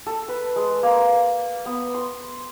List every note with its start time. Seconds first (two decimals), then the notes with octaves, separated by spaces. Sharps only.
0.07 A4
0.28 B4
0.56 G#3
0.83 A#3
1.66 B3
1.94 C6